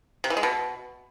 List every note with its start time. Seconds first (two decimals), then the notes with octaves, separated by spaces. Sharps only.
0.24 C3
0.30 E3
0.37 G#3
0.43 B2